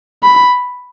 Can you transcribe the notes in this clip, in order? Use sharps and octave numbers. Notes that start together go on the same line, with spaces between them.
B5